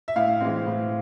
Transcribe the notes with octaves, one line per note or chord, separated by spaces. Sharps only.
E5
A2 F5
E3 G#3 C4
A2